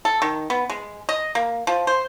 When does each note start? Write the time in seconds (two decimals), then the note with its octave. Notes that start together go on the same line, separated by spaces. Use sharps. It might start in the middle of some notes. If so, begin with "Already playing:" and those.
0.05 A4
0.22 D#3
0.50 B3
0.70 G#3
1.09 D#5
1.35 A#3
1.67 F3
1.87 C5